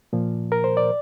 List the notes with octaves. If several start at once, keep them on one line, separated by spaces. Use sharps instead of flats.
A#2 F3
A#4
C5
D5